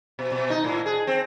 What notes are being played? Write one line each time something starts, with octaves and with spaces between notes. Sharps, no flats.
B2
B2
D#4
A2
G#4
C4